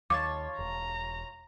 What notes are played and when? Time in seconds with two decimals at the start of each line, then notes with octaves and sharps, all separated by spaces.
0.10 D#2 F4 C#5 A5 D6
0.59 E1 A#5